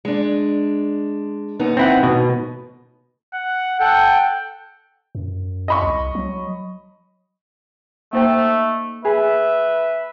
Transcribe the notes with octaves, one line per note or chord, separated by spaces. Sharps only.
G#3 D4
D#2 B3 D#4
C4 E4 F#5
B2
F#5
A4 F#5 G5
F#2
D#5 B5 C#6
C2
F#3
A3 A#3 D#4 C5 G5
G#4 B4 E5